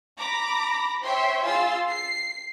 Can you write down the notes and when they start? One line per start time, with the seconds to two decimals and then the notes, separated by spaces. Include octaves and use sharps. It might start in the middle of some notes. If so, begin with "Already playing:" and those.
0.19 A#5 B5 D6 A#6
1.02 C5 C#5 E5 G5 C6
1.44 F4 G#4 C6 E6 A6
1.88 C7